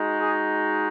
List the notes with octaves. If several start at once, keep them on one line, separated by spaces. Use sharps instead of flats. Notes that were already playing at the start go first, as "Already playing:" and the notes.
Already playing: G#3 D#4 F#4
G#4